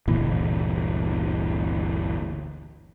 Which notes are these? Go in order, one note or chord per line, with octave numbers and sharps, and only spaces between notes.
G1 D2 A#2 E3